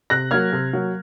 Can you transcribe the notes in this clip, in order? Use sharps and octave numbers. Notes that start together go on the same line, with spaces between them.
C3 F#6 A#6
F#3 A#3 F6 G#6
C3
F#3 A#3